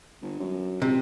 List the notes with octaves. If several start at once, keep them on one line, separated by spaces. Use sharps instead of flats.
G1
F#2
C#2 C3